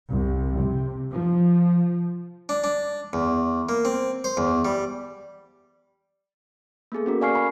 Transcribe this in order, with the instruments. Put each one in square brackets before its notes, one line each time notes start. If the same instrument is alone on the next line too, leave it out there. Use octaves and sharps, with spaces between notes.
[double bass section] C2
C3
F3
[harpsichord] D4
D4
E2
A#3
C4
C5
E2
G3
[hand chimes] A#3 B3 G#4 A4
C#4 F#4 A#4
D5 F5 G#5 C#6 F6 C7
G#5 B5 C#6